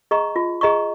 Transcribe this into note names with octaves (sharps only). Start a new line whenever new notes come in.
G#4 D#5 A#5 C#6
F4
G#4 D#5 A#5 C#6